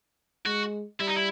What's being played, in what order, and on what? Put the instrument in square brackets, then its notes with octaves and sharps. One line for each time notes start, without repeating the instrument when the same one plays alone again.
[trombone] G#3 [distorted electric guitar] F#4
[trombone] G3 [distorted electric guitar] E4
[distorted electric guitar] D#4
E4